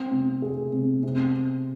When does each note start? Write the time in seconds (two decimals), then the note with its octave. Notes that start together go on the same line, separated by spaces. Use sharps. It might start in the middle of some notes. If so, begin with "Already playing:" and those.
Already playing: C4
0.11 C3
0.42 G#4
0.72 C3
1.03 C3